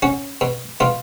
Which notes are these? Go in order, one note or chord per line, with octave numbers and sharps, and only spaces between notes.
C#4 F#4
B2
B2 F4